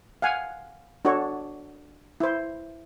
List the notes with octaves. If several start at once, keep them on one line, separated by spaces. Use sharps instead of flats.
F5 F#5 G#5
D4 F#4 A4 C#5
E4 C5